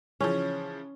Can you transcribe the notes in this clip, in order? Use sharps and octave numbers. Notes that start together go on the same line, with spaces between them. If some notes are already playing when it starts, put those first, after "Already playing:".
C#3 E3 F3 C#4